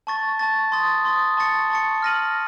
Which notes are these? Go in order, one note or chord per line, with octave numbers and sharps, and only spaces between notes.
A5 C#6 A6
A5 C#6 A6
C6 D#6 A6
C6 D#6 A6
A5 C#6 A6 C#7
A5 C#6 A6 C#7
F6 A#6 D#7 F#7